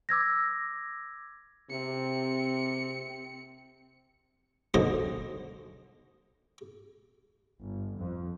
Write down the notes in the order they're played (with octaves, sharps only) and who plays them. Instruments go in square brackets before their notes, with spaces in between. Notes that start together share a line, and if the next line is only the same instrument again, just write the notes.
[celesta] D6 E6 G#6 A#6
[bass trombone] C3 [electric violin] C4 C#7
[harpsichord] B1 F#2 D3 C5 D#5
[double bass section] G1
F2